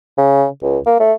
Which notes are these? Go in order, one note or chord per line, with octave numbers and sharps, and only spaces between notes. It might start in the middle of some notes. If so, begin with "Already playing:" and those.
C#3
C#2
A#3
A3